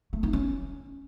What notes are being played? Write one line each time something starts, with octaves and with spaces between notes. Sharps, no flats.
A3
D#4
C#4